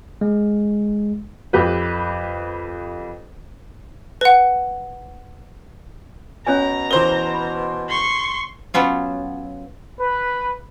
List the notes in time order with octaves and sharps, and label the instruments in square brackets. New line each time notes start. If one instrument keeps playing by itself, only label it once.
[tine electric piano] G#3
[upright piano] F2 G4 B4
[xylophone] B4 F#5
[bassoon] B2 [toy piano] C#4 C#5 G#5 [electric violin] A#5
[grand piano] E3 C5 G7 [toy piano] A#4
[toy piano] B5
[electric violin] C6 C#6
[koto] F#3 B3 C#4 F4
[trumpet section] B4